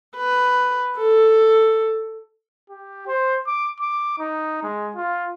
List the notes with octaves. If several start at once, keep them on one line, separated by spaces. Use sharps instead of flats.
B4
A4
G4
C5
D6
D6
D#4
G#3
F4